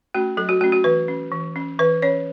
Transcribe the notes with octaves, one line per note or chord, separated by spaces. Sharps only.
A3 C#4 F#4
F#3 A4
F#4
A3 C#4 F#4
F#4
E3 B4
C#4
E3
C#4
E3 B4
C#4 C#5